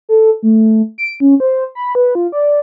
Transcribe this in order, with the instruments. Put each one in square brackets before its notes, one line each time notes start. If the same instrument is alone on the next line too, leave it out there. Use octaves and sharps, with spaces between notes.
[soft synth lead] A4
A3
D7
C#4
C5
B5
B4
F4
D5